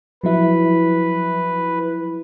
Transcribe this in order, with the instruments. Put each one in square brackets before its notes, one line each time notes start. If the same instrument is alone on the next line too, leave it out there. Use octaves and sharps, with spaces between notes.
[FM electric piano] F3 F#3 E4 [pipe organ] B4